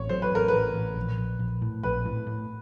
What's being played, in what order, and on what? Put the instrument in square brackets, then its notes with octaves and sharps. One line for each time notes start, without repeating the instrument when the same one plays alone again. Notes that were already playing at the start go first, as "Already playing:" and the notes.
Already playing: [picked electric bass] A1 [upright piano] C#5
[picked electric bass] F#3 [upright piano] C5
[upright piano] B4
[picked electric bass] A1 [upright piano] A#4
[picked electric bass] A1 [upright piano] B4
[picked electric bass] A1
A#1
A#1
A#1
A2
[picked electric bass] A#1 [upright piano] B4
[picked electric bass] A2
A2